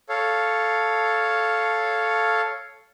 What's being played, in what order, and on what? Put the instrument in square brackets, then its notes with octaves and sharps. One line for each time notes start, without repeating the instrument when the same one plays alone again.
[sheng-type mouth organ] A4 C#5 F5